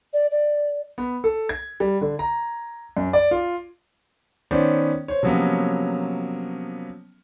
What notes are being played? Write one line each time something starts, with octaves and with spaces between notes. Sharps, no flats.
D5
D5
B3
A4
G#6
G3
D3
A#5
F#2
D5
F4
D#3 B3 C#4 C5 D5
C5 C#5
C3 F3 F#3 A#3 B3 C#4